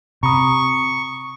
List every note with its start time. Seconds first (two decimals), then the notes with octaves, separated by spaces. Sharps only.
0.23 C3 A#5 B5 C#6 D#6